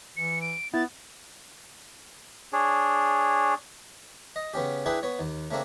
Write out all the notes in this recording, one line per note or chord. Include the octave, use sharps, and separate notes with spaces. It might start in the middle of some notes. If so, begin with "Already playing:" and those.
E3 C#7
D7
B3 E4 A6
D4 G#4 C#5
D#5
C#3 B3 C#4 G4
D4 E4 G#4 B4 G5 C6
B3 C#5
D#2
C#3 A3 A#3 C4 D4